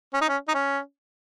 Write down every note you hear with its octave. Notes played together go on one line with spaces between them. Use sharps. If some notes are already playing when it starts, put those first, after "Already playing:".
C#4
D#4
C#4
D#4
C#4